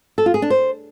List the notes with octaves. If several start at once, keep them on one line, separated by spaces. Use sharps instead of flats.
A4
F4
G#4
D4
C5